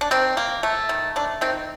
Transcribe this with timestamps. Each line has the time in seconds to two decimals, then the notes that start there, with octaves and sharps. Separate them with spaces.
0.01 D4
0.11 D#3 C4
0.37 A#3
0.63 A3
0.89 D#3
1.16 A3 D4
1.41 D#3 C4